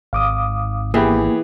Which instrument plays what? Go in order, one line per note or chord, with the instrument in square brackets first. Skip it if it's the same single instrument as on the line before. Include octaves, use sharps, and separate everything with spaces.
[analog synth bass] G#1 [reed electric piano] F5 D6 D#6
[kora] E3 [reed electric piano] A#3 [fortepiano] B3 G4 G#4